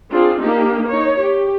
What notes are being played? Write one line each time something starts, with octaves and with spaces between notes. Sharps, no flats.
C4 D4 F4 G#4
A#3 D4 D#4 G4
D#4 C#5
G4